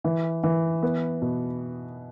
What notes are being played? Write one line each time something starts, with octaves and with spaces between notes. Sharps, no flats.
E3
E3
B3
B2